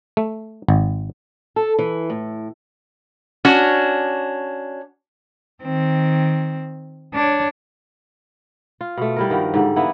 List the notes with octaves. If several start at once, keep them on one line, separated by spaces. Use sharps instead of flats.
A3
G#1
A4
E3
A2
C#4 D4 F#4
D#3 C4
D4 C#5
F4
B2 A3
G3 E4 A#4
G2 D#3 F3 F#4
G#2 D3 G3
E3 A#3 B3 E4